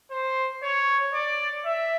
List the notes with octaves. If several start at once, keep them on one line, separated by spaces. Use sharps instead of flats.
C5
C#5
D5
E5